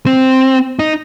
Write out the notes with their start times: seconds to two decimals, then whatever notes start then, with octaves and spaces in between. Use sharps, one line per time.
0.06 C4
0.79 D#4